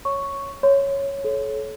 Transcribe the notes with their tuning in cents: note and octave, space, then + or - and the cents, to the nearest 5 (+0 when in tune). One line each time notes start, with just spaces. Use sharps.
C#5 +0 C#6 +0
C#5 +0 C6 -35
A4 -35 C#5 +0